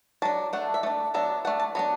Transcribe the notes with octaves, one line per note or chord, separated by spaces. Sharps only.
F#3 D4 A5
A3 D4 F#5
E5
A3 D4 D5
F#3 B3 D4 E5
A3 D4 F#5
A5
F#3 B3 D4 B5